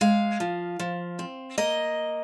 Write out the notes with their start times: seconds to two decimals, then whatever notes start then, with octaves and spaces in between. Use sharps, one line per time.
0.01 G#3 F5
0.40 F3
0.79 F3
1.19 C4
1.58 A#3 D#5